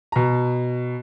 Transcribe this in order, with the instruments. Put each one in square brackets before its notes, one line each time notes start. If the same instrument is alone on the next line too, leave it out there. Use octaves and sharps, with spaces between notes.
[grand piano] B2 A#5